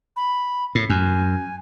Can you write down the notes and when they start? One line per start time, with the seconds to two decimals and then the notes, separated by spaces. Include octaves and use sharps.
0.16 B5
0.75 A2
0.90 F#2 G#5